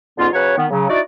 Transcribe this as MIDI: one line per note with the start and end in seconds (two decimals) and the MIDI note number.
0.18 0.27 44
0.18 0.27 50
0.18 0.27 59
0.18 0.27 61
0.18 0.27 65
0.33 0.57 49
0.33 0.57 54
0.33 0.57 71
0.33 0.57 73
0.57 0.66 51
0.57 0.66 59
0.70 0.87 49
0.70 0.87 54
0.89 0.99 63
0.89 0.99 64
0.89 0.99 66
0.89 0.99 74